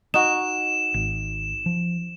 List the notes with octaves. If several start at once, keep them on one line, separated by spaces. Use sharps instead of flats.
D#4 F#4 E7
G#1
F3